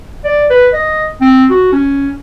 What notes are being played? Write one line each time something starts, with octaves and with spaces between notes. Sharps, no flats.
D5
B4
D#5
C4
F#4
C#4